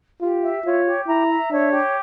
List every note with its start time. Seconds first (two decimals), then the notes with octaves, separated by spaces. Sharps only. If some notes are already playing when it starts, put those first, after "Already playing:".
0.21 F4 G4
0.43 E5
0.64 F4 C#5
0.85 G4
1.06 E4 A#5
1.28 E5
1.50 D4 C#5
1.72 G4